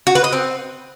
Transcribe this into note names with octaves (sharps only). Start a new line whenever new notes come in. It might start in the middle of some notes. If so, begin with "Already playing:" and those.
F#4
B4
D#5
C4